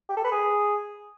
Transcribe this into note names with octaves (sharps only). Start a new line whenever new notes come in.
G4
A4
B4
G#4